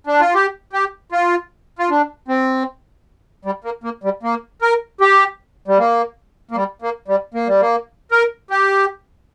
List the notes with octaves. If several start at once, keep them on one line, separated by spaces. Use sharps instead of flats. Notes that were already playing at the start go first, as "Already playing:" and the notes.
D4
F4
G4
G4
F4
F4
D4
C4
G3
A#3
A#3
G3
A#3
A#4
G4
G3
A#3
A#3
G3
A#3
G3
A#3
G3
A#3
A#4
G4